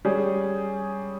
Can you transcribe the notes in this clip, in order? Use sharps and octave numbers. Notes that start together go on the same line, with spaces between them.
G3 C#4 G#4